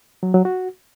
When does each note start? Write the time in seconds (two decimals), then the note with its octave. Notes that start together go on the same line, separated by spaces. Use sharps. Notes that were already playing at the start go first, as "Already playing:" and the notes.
0.23 F#3
0.34 F#3
0.45 F#4